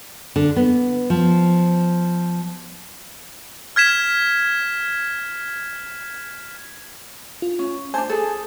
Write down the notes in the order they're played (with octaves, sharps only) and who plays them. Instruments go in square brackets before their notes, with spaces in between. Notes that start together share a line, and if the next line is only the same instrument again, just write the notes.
[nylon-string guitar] D3
B3
F3
[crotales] F6 G#6 B6 E7
[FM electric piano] F4
[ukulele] C#4
[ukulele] D4 C5 [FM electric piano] G#5 A5
[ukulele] G#4 A4